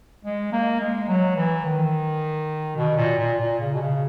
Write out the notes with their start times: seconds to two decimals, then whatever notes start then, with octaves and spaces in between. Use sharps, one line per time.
0.25 G#3
0.52 A#3
0.81 G#3
1.08 F#3
1.36 E3
1.65 D#3
2.76 B2
2.97 A#2
3.19 A#2
3.39 A#2
3.60 C#3
3.74 B2
3.81 C#3